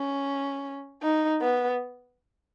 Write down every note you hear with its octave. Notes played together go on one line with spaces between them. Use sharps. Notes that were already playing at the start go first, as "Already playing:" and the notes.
Already playing: C#4
D#4
B3